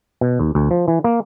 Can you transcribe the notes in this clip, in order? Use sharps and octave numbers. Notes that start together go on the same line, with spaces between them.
B2
D#2
D2
F3
E3
A#3